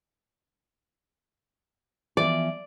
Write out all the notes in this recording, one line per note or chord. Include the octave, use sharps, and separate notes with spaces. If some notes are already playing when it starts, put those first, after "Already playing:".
E3 F3 B3 D5